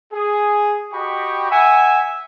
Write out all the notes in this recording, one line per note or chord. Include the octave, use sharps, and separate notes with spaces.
G#4
F#4 G4 D#5 G5 B5 C#6
E5 F#5 G#5